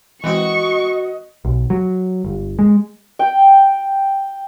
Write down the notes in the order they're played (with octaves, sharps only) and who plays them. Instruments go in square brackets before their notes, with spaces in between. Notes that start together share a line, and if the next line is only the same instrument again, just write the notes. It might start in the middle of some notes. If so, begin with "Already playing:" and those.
[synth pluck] E3 G#3 C4 [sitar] F#4 B4 [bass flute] D#5 [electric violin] C#6
[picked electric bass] B1
F#3
G1
G#3
[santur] G5